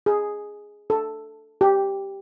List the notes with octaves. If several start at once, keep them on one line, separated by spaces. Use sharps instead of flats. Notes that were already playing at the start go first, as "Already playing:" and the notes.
G#4
A4
G4